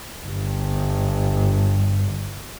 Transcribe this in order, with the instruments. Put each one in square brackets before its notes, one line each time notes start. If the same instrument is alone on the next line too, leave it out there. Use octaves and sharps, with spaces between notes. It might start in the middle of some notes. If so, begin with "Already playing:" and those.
[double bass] G1 G2